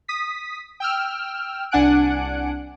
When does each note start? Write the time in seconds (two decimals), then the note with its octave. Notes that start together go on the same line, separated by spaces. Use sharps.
0.08 D#6 B6
0.80 G5 E6 F6
1.71 C2 D4 F#5 G#5 F#6 D7